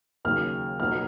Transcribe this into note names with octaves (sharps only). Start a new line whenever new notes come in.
D#2 C#3 F#3 F6
B1 B2 F#3 A#3 F6